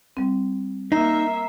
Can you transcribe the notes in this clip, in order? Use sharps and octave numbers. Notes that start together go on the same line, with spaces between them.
G3 C4
A#3 D#4 E5 A#5 C7